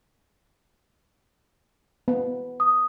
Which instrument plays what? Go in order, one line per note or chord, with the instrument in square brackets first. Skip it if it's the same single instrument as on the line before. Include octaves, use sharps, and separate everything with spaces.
[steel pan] B3
[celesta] D#6